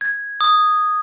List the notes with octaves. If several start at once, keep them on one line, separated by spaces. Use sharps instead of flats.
G#6
D#6